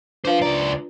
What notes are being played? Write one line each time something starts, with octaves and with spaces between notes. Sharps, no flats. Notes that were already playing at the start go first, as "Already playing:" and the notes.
D4 F4 B4 C5 F5
C#2 D5 A#5